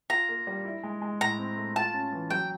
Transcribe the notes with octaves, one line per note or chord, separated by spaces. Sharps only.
F4 A#5
A#3
G3
E4
G#3
G#3
A2 A#5
C4
A3
F4 A5
C#4
E3
F#3 G5